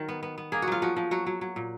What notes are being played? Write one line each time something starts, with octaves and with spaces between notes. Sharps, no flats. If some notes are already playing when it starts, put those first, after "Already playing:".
Already playing: D#3 F#3 A#4
B3
B3
B3
A#3 G#4
F#4
F#3 F4
F3 F#4
F3
F#3 F#4
F#3
F#3
A#2